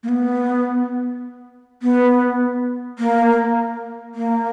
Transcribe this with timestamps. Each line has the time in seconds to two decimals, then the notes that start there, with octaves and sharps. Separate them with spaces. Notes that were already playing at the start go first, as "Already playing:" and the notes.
0.03 A#3
0.09 B3
1.83 B3
2.99 A#3
4.15 A#3